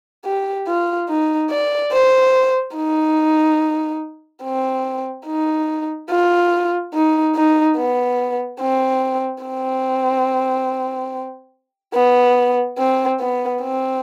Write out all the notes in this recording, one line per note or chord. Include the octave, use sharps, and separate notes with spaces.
G4
F4
D#4
D5
C5
D#4
C4
D#4
F4
D#4
D#4
B3
C4
C4
B3
C4
B3
C4